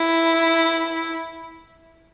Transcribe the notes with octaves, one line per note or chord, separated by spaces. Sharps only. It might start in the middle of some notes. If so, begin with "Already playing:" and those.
Already playing: E4